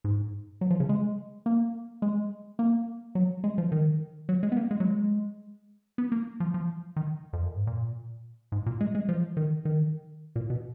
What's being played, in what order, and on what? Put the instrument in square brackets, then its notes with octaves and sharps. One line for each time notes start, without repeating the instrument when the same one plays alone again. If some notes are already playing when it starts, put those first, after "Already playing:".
[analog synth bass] G#2
F#3
F3
C#3
G#3
A#3
G#3
A#3
F#3
G#3
F3
D#3
F#3
G#3
B3
A#3
G#3
F#3
G#3
B3
A#3
F3
F3
D#3
F2
F#2
G#2
A#2
G#2
A#2
G#3
G#3
F3
D#3
D#3
A#2
B2